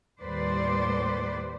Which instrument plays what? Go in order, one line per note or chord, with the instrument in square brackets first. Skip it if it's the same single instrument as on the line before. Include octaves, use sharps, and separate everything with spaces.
[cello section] D#2 A2 G3 B4 C5 D5